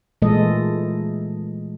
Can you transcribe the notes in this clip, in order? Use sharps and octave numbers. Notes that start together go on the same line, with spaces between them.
A#2 E3 G#3 A3 A4 D#5